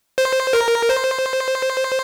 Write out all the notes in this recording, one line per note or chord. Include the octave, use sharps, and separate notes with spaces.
C5
A#4
C5